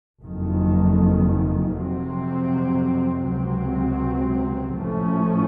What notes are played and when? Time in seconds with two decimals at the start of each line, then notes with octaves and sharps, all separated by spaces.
0.20 F#1 F2 D#3
1.72 F2 C3 F#3 C4
3.24 C#2 C3 F#3 C4
4.75 A1 A2 F3 A3 C#4